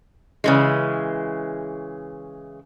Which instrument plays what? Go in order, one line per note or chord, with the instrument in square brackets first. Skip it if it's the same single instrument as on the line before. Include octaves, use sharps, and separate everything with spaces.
[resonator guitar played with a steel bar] C#3 E3 G#3